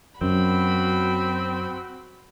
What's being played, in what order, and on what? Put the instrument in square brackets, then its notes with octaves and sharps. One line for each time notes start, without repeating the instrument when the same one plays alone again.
[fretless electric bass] F#2 [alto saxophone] C4 [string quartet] F#4 B5